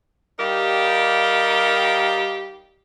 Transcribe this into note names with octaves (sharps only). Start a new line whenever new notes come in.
G3 D#4 G4 A#4 F5